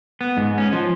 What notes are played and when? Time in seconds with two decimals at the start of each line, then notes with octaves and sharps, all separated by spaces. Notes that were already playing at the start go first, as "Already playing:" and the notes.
0.21 B3
0.37 G#2
0.58 C#4
0.73 F3